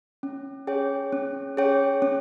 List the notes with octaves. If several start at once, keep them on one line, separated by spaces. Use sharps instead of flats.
C#4
G#4 C#5 G5
C#4
G#4 C#5 G5
C#4